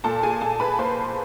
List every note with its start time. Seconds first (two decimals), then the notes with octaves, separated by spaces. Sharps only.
0.04 A#2 A4 A5
0.23 G#4 G#5
0.41 A#2 A4 A5
0.60 B4 B5
0.79 A#3 C5 C6